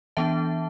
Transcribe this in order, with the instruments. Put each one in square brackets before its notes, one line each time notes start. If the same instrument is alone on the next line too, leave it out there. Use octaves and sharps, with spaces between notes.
[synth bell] E3 B3 D4 E5 A5